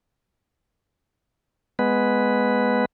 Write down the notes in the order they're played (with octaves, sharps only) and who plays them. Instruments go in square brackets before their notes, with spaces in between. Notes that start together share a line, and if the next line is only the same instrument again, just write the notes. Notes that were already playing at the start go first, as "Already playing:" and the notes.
[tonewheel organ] G#3 B3 B4